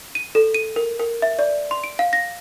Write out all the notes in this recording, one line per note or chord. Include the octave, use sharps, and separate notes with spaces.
D#7
A4
D#7
A#4
A#4
E5
D5
C6
D7
F5
A#6